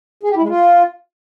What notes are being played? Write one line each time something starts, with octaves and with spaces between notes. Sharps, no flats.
G#4
G4
E4
G#3
F4